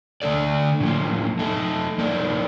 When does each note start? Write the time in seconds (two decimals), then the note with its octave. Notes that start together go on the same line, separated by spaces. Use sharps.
0.22 D3 A3 D4 A4 D5
0.80 A2 F3 A#3
1.39 A3 D#4 A4
1.98 F3 A#3 D#4 A#4 D5